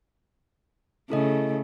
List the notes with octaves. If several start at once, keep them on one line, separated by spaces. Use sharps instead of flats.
C#3 A3 E4 A4 D#5